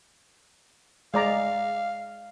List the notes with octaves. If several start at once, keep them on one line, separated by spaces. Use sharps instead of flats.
G#3 D5 F5 A#5